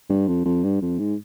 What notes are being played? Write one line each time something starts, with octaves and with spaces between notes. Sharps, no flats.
G2
F2
F2
G2
F2
G#2